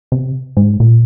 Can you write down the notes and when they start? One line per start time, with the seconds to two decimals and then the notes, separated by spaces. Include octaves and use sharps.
0.12 C3
0.57 G#2
0.80 A#2